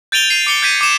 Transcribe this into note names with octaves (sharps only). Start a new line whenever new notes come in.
G6 A6 D7 D#7 F7 G7
C7 D#7 F7
D6 C#7 G7
G6 G#6 B6 D#7
D6 C#7 E7